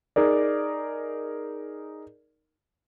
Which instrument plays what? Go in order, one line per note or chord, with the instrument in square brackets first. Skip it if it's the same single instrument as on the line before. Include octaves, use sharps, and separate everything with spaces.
[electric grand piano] D#4 G#4 A#4 D5